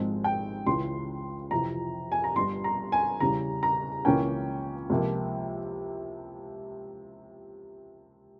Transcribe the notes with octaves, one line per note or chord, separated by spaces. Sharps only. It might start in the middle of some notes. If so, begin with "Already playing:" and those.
Already playing: G#1 G#2 F3 G#3 C4
G5
C#2 C#3 E3 C6
F2 C3 E3 A#5
G#5
A#5
G1 G2 G3 C6
A#5
G#5
E2 C#3 G3 A#5
A#5
C#2 C#3 E3 A#3 C#4 G5
C#2 C3 F3 A#3